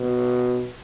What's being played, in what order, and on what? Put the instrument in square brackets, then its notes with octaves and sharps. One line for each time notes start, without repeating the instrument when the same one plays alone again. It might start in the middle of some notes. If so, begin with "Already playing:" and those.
Already playing: [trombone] B2